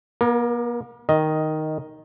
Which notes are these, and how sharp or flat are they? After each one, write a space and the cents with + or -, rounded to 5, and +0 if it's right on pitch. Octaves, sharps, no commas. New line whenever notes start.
A#3 +45 A#4 +0
D#3 +0 D#5 +10